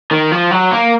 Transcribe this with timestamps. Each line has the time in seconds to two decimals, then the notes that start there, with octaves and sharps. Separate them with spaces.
0.11 D#3
0.31 F3
0.51 F#3
0.71 A#3